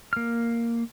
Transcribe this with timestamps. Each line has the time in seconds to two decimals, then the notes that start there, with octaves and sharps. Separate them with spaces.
0.13 A#3 F6